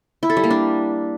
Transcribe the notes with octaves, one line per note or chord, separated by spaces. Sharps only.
E4
A4
G3
A#3
D4